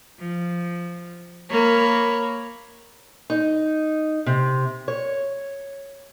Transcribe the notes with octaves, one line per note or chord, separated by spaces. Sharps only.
F3
A#3 A#4 C#5 B5
D#4
C3
C#5